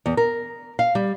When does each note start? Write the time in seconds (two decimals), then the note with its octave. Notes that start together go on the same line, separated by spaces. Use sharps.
0.06 E2
0.17 A#4
0.79 F5
0.95 G3